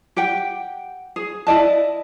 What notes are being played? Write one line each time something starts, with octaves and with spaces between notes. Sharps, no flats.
G4 F#5 G5
G#4
E4 D5 D#5 A5